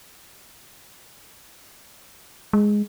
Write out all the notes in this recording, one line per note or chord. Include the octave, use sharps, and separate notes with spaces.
G#3